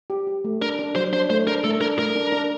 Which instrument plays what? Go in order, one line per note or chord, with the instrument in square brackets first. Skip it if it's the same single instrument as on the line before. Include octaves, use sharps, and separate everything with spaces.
[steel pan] G4
G4
A3
[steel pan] D4 [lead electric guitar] A#4
[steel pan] D4
[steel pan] F#3 [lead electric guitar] C5
[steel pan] D4 [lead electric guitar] C5
[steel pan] A3 [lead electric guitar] C5
[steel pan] D4 [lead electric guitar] A#4
[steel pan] A3 [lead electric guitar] A4
[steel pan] D4 [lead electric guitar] A#4
[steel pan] A3 [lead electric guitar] A#4
[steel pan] D4
D4